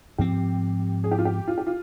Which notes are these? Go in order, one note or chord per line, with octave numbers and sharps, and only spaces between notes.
G#2 F3 C4 G4
G#4
G4
F4
G4
F4
G4
F4